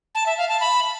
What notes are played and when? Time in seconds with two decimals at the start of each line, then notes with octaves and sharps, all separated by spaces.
0.15 A5
0.26 E5
0.38 F5
0.49 A5
0.60 B5